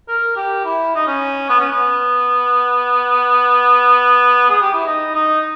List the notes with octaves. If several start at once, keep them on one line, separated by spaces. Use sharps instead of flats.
A#4
G4
E4
D#4
C#4
B3
C#4
B3
G#4
G4
E4
D#4
D#4